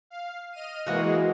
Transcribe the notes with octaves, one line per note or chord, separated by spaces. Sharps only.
F5
D#5 F6 D#7
E3 G#3 A#3 F#4 D#5 F#5